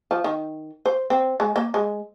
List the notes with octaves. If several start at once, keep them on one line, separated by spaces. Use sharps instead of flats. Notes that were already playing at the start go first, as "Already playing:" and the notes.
F3
D#3
C5
C4
G#3
A#3
G#3